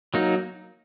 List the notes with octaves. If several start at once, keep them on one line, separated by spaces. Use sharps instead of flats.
F#3 A#3 D#4